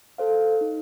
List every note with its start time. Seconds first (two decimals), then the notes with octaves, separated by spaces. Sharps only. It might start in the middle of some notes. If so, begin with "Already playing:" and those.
0.18 A4 C5 F5
0.61 D#4